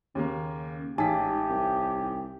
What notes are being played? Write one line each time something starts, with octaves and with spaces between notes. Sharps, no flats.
D#2 C#3 A#3
A1 G#2 D#4 G4 G#5 A5 B6
C2